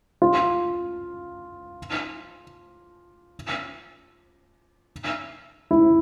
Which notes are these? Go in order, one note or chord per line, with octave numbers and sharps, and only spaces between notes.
F4
E4